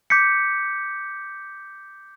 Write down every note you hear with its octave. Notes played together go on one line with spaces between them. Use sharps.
D6 G6 B6 C#7